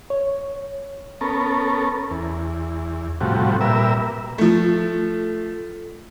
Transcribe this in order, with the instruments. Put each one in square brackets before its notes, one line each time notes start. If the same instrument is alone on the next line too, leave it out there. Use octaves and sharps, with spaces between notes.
[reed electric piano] C#5
[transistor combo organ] B3 C#4 A4 A#4
E2
A2 C3 F3 G3 F#4
A#2 G3 A#4 B4 E5 E6
[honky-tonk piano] F3 A3